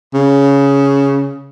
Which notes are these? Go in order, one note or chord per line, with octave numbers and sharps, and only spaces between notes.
C#3